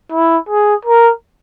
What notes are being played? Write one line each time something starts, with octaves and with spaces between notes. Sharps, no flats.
E4
G#4
A#4